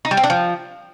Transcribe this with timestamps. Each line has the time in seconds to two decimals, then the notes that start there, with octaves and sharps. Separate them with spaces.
0.05 D#4
0.11 G3
0.17 C4
0.24 D4
0.30 F3